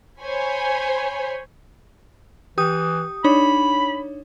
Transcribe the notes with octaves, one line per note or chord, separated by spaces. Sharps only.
C5 C#5 G#5 B5
E3 G4 D#6
D4 D#4 C#5 B5